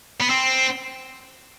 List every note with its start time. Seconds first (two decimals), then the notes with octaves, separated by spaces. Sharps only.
0.21 B3
0.30 C4